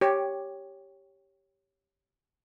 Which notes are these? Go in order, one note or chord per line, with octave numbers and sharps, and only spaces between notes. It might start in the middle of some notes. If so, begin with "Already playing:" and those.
G4 C#5